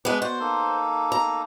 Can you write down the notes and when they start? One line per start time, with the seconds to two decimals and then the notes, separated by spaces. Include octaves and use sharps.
0.05 G#3 B3 D4
0.22 F#4 C5 D5 F#5
0.40 A#3 D#4 A4
1.12 A#5